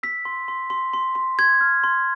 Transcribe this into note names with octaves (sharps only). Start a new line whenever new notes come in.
E6 B6
C6
C6
C6
C6
C6
C6 G#6
F6
C6